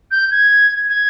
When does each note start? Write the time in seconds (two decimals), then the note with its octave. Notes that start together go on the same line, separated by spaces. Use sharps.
0.11 G6
0.31 G#6
0.90 G#6